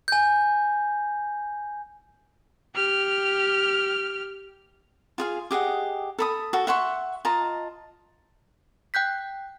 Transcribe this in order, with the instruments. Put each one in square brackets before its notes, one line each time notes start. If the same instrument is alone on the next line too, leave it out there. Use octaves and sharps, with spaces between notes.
[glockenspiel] G#5 G6
[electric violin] G4 F6
[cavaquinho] F4 G#4 F5
G4 G#4 D#5 F#5
A4 B5 D#6
F#4 A4
E5 F#5 C6 C#6
F4 D#5 A5 A#5
[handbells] G5 F#6 G6 B6